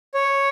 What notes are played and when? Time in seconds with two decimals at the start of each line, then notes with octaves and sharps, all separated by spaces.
0.14 C#5